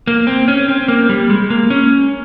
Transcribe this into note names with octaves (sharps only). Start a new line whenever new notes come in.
A#3
C4
C#4
C4
A#3
G3
G#3
A#3
C#4